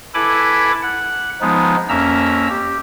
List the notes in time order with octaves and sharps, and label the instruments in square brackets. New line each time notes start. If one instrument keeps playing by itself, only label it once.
[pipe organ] E4 A4 B4 G#5 B5 D6
F#5
F3 G#3 B3 D#4
F2 A#3 C#4 E5 A#5 E6
G4